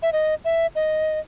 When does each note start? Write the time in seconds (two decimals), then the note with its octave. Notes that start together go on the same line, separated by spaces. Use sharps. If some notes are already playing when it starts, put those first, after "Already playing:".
0.02 E5
0.13 D#5
0.45 E5
0.75 D#5